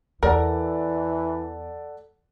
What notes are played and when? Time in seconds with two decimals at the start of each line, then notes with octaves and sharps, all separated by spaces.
0.23 E2 E3 A4 A#4 D5 F#5